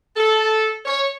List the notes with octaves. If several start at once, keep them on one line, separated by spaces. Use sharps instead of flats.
A4
C#5